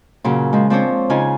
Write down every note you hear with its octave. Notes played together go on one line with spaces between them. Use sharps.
A#2 C#3 F#3
F3 G#3
F3 C4 D4 C5 C#5
C#3 C#4 D#4 F4 G#5